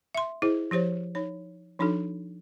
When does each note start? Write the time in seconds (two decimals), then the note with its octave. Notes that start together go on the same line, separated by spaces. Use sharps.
0.15 E5 C6
0.42 E4 G#4 C5 D#5
0.71 F3 G4 C5 C#5
1.15 D#4 C#5
1.79 F3 D4 D#4 F#4 A4